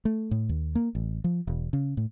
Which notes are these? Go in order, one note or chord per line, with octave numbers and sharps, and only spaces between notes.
A3
A2
D#2
A#3
A1
F3
E1
C#3
A2